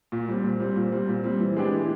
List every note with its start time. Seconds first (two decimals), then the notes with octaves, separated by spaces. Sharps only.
0.12 A#2
0.28 G3 C4
0.44 A#2
0.60 G3 C4
0.76 A#2
0.92 G3 C4
1.08 A#2
1.24 G3 C4
1.40 E3
1.56 G#3 B3 D4 G4
1.73 E3